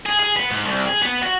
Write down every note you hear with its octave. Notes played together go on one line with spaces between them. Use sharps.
G#4
G#4
B3
G#2
C2
G#4
B3
F#4